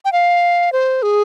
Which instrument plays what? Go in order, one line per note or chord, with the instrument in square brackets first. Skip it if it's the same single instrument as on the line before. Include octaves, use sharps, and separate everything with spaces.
[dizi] G5
F5
C5
G#4